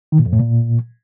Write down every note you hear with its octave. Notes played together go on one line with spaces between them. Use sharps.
D#3
A#2
F2
A2
A#2